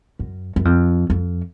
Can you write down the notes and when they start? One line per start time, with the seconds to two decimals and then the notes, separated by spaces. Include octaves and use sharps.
0.19 F#2
0.56 F#2
0.65 F2
1.10 F2